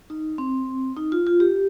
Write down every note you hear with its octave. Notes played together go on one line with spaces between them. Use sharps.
D#4
C4
D#4
F4
F4
G4